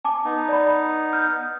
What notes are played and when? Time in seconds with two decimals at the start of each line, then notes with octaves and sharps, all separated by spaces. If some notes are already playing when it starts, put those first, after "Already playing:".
0.05 G#5 A5 D6
0.25 B3 D#4
0.49 D5 B5
1.13 F6 G6